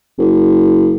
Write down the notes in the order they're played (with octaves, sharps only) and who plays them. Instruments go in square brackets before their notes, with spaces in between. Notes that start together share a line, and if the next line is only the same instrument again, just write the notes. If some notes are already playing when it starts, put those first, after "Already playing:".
[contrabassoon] F#1